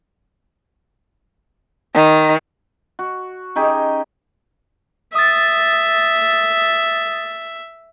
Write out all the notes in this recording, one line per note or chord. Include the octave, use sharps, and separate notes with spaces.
D#3
F#4
C#4 D#4 G4 G#4
E5 D#6 A6